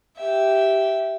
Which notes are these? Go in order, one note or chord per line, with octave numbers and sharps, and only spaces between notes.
G4 E5